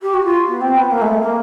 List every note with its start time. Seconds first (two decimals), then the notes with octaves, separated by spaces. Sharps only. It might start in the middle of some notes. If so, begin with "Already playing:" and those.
0.02 G4
0.13 F#4
0.24 F4
0.47 B3
0.60 C4
0.76 B3
0.91 A#3
1.01 G#3
1.05 A3
1.20 A#3